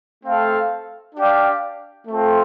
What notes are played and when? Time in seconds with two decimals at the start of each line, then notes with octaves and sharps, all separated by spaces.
0.23 A3 C4 A4 F5
1.15 D4 G4 D5 F5
2.07 A3 C4 F4 A4